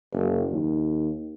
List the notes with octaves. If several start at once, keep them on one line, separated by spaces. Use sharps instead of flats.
F#1
D#2